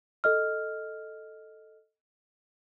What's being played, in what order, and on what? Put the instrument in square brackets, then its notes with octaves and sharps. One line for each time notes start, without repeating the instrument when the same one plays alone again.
[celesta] A4 D#5 F6